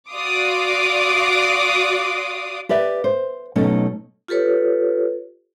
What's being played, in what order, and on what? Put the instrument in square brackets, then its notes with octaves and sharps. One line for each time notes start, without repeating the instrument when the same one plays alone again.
[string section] F#4 D5 F5 C6 D6 D#6
[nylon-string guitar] G4 B4 D5 E5
C5
B2 F#3 A3 C#4 D#4 A4
[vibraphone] F4 G4 A4 B4 C#5